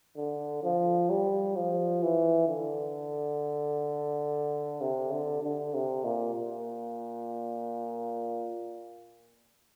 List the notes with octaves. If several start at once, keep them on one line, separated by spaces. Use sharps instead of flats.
D3
F3
G3
F3
E3
D3
C3
D3
D3
C3
A#2
A#2